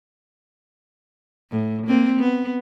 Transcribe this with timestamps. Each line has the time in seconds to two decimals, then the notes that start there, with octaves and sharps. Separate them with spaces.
1.51 A2
1.87 A#3 C4
2.20 B3